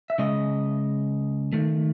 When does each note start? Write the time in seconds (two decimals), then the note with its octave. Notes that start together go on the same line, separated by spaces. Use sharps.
0.10 E5
0.18 C#3 G#3 D#5
1.53 D#3 A3